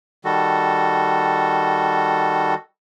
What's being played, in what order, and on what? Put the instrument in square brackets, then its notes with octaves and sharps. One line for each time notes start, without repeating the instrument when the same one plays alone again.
[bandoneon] D#3 G3 F#4 A4